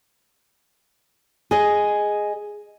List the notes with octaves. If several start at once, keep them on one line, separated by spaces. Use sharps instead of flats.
G#4 D#5